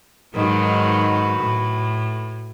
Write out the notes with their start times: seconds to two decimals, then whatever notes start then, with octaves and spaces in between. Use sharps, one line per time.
0.34 G#2 D#3 F#3 F#4 B4
1.39 A2